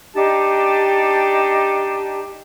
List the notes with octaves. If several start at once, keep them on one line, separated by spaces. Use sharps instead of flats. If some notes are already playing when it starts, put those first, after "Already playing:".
D4 D#4 G4 A5